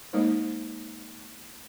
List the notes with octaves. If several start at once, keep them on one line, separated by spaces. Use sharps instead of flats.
G#3 A#3 D#4 C5